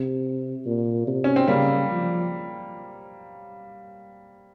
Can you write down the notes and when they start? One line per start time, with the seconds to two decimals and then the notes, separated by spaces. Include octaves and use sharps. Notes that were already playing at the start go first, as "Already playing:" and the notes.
Already playing: C3
0.66 A#2
1.07 C3
1.24 C#4
1.36 C4
1.48 C#3 G3 A#3
1.90 F3